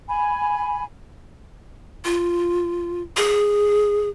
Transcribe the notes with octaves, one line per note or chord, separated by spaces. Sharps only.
G#5 B5
F4
G#4